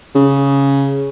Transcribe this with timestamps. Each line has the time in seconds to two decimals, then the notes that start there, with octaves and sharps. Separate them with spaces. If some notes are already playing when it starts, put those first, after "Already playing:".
0.15 C#3